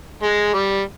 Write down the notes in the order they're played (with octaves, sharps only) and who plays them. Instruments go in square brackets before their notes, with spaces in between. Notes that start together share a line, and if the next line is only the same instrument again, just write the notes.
[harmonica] G#3
G3